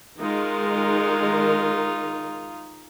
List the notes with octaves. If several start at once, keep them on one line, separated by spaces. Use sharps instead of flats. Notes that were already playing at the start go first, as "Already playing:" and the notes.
D#3 G#3 D#4 F4 A#4